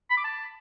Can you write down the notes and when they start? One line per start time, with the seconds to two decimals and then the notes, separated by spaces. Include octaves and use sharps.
0.10 B5
0.17 D6
0.24 A5